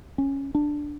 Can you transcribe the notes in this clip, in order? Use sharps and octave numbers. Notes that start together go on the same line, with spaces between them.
C#4
D4